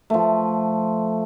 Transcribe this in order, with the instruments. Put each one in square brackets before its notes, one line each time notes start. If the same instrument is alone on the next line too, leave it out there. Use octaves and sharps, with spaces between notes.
[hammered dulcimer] F3 A3